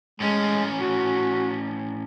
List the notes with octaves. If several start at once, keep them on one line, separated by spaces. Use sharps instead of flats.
A2 G#3 C#4
F#4